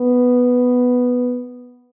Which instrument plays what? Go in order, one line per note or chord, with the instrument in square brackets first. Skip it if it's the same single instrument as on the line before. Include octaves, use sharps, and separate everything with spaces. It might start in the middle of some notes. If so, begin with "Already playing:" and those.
Already playing: [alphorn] B3